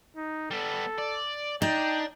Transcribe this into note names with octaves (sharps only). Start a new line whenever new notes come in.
D#4
G3 B3 A4
D5
D4 D#4 G5